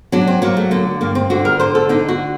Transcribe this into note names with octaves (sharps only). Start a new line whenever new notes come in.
F#3 D4
C4
F#3 A#3
A3
D3 A#3
G2 A#3
C4
D3 F#4
A#4
D3 C5
A4
D3 D#4
F#4